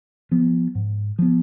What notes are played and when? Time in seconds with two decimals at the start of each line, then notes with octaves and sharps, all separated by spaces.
0.31 F3 B3
0.75 G#2
1.19 F3 B3